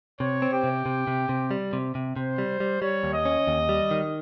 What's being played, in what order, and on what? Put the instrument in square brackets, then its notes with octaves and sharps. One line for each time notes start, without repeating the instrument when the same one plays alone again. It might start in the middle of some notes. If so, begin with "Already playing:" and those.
[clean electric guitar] C3 [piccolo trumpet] C#5
[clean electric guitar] C4
[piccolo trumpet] G4
[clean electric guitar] C3
C3
C3
C3
G3
C3
C3
[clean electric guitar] C3 [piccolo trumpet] C5
[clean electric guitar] G3
G3
[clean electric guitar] G3 [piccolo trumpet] C#5
[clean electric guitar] D#2
[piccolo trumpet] D#5
[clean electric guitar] C#4
D#2
G3
D#3